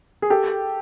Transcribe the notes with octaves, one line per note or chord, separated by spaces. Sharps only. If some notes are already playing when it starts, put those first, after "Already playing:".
G#4
G4 A4